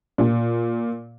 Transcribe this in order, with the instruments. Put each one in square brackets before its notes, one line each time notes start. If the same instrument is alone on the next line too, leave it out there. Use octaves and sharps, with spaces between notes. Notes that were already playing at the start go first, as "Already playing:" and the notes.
[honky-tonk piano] A#2